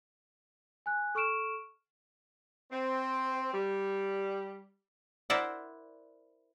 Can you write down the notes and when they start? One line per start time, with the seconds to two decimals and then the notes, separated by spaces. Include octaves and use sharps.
0.86 G#5 F#6
1.15 A4 C#6 F6 D7 E7
2.71 C4
3.54 G3
5.30 E4 A#4 C5 D5 E5 F#5